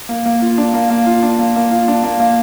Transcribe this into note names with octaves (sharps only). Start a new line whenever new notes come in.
A#3
A#3
F4
D4
A#3
A#3
F4
D4
A#3
A#3
F4
D4
A#3
A#3